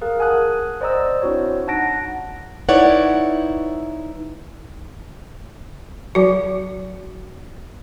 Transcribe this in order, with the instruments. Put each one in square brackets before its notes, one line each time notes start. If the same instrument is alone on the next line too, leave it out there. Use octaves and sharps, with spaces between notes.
[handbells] G#4 A#4 F5 F#6
F#5 G#5 A5 D#6 F#6
C5 D5 D#5 A#5 D#6 E6
C4 D4 E4 F#4 C5 C#5
D#4 F#5 A5 F#6 A#6 D7
[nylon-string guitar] D#4 E4 B4 C#5 D5 F#5
[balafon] F#3 F#4